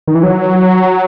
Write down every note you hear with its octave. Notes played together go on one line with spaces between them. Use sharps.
D#3
E3
F#3